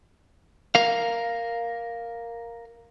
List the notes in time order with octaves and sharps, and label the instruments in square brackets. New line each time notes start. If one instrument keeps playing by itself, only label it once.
[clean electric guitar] A#4 F5